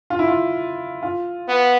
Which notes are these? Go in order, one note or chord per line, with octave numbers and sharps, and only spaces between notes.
F4
E4
F4
F4
B3